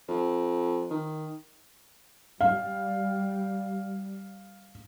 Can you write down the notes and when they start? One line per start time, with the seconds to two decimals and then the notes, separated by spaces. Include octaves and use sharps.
0.08 F2
0.91 D#3
2.41 G3 F5